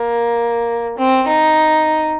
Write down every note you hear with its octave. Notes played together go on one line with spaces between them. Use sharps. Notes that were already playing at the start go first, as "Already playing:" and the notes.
Already playing: A#3
C4
D#4